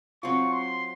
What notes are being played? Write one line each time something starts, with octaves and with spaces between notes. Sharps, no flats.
F#3 C4 F4 C#6
C6